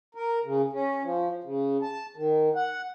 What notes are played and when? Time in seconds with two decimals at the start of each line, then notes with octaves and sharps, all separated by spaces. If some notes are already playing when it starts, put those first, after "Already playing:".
0.15 A#4
0.44 C#3
0.73 C#4
1.03 F3
1.44 C#3
1.82 A5
2.16 D#3
2.56 F#5